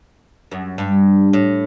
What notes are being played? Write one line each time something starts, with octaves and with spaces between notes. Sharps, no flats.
F#2
G2
A2